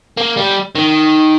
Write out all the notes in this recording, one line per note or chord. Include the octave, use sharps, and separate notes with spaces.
A#3
G3
D#3